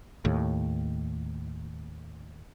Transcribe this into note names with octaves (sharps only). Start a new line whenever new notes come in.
D#2 A2